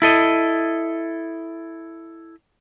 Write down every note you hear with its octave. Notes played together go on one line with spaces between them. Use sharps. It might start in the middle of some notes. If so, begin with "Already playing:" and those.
E4 A4 D#5